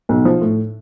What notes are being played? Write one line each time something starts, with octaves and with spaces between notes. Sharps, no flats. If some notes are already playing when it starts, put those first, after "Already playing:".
B1
F3
A2